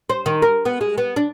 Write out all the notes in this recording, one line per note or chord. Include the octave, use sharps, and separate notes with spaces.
C5
D#3
A#4
B3
G#3
B3
D4